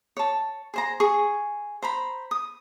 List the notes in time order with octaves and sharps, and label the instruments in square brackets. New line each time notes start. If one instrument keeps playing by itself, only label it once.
[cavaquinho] C#5 A5
G#4 C5 A#5
G#4 C#6
C5 A#5 B5
D#6